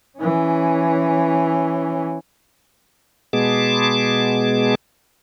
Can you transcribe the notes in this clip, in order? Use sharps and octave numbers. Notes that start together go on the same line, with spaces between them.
E3 C#4
B2 G#3 B3 G#4 A5 D6